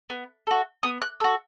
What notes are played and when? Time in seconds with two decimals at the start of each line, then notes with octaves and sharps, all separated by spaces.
0.10 B3
0.47 F#4 A4
0.83 B3 D#6
1.02 F#6
1.20 F#4 A4 E6